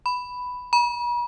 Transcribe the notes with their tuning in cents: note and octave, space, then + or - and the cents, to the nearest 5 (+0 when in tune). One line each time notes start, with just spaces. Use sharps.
B5 +5
B5 -45